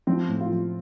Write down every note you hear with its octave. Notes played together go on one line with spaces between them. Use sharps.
F3 C4
A2
F4
F3